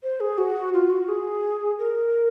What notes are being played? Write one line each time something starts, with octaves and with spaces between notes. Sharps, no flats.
C5
G#4
F#4
F4
F#4
G#4
A#4